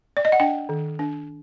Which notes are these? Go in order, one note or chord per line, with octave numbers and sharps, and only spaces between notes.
D5
D#5
F#5
D4 G5
D#3
D4